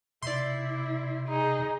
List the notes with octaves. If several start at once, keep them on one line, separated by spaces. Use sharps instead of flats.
C3 E4 D5 C6
D#4 G#4